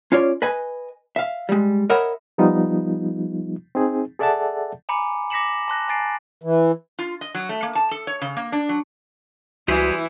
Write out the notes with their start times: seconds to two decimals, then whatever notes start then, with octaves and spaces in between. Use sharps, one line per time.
0.12 C#4 F4 C#5 D5
0.42 B4 D#5 G#5
1.16 E5 F5
1.49 G3 G#3
1.90 A#4 C#5 D#5 E5 F#5 B5
2.38 F3 G3 B3 D#4 F4
3.75 C4 D#4 G#4
4.19 G#4 A4 D5 E5 F#5 A5
4.89 G#5 A#5 B5 D6 C#7
5.30 D6 A#6 B6 C#7 E7 F#7
5.68 A5 C6 F#6 A#6
5.89 G#5 A#5 A6 C7 D7
6.44 E3
6.99 F4
7.21 D#5
7.35 F#3
7.49 A3
7.63 A#3
7.75 A5
7.91 A4
8.07 C#5
8.21 C#3
8.37 A#3
8.52 D4
8.69 F#3
9.68 C#2 E3 G3 E4 F#4 G#4 C5